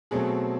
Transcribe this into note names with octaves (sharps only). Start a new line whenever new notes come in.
B2 F#3 A3 C4 G#4